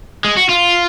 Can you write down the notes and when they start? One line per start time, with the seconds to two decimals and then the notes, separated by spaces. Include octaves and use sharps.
0.25 G#3
0.37 F#4
0.49 F4